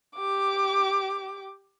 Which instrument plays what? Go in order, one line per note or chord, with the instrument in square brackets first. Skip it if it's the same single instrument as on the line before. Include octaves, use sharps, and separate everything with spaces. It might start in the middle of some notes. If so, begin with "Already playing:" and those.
[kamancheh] G4 D6